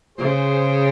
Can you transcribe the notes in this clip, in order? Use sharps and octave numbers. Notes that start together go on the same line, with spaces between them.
C#3 G#4 C5